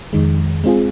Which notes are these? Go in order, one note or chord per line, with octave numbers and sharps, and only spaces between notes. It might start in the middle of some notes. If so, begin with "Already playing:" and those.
F2 D#3 G#3
G#3 C4 F4 G#4